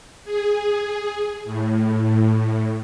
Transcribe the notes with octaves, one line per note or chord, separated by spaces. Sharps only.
G#4
A2